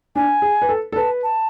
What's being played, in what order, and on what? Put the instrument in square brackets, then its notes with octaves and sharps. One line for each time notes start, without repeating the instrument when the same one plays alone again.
[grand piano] D4 [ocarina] G#5
[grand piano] G#4
B4
A4
A4
[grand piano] B4 [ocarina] A5
[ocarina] A5